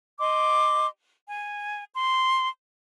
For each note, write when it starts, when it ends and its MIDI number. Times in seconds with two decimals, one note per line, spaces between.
0.19 0.86 75
0.19 0.86 84
0.19 0.86 86
1.29 1.84 80
1.94 2.48 84